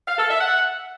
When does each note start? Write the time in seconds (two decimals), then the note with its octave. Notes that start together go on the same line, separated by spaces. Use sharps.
0.07 F5
0.18 A4
0.30 E5
0.41 F#5